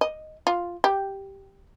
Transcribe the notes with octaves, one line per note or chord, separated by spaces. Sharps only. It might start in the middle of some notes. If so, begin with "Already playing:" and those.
D#5
F4
G4